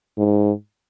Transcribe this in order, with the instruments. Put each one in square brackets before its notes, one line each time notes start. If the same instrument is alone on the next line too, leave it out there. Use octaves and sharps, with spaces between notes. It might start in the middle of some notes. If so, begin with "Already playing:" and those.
[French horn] G#2